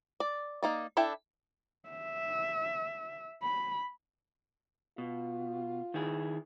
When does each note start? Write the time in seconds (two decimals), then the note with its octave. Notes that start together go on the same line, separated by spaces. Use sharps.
0.20 D5
0.63 A#3 D#4 D5
0.97 D4 E4 A4 E5 G5
1.89 E5
3.43 B5
4.98 B2 F4
5.94 D#3 E4 G#4